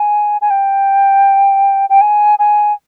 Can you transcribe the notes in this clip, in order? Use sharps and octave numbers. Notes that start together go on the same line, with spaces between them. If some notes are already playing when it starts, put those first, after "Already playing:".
Already playing: G#5
G#5
G5
G5
G#5
G#5